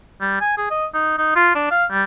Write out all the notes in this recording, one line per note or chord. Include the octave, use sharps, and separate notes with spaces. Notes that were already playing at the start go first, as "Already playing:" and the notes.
G3
G#5
G#4
D#5
D#4
D#4
F4
D4
F5
G3